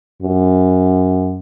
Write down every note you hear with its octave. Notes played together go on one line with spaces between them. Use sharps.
F#2